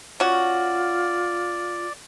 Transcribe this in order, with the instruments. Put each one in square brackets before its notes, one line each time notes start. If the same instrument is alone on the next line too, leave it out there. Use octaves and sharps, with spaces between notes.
[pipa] C#4 F#4 [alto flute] F4 [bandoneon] D5